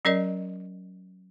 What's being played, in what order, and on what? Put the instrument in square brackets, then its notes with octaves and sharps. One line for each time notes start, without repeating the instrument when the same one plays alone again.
[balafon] F#3 C#4 A#4 D5 D#5